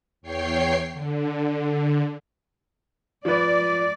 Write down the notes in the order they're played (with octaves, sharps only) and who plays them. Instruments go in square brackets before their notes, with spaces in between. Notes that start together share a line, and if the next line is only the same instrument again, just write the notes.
[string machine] E2 C#5 G5 C7
D3
[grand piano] F3 B4 [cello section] D5